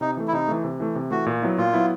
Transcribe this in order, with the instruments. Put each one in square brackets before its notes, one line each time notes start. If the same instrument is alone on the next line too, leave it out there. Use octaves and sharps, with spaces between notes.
[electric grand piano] C3 [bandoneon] D#4
[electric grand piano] E3 A3
[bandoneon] E4
[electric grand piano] C3 [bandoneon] D#4
[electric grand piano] E3 A3
C3
E3 A3
C3
[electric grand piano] E3 A3 [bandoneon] F#4
[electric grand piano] A#2
F#3 B3 E4
[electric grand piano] A#2 [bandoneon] F4
[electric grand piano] F#3 B3 E4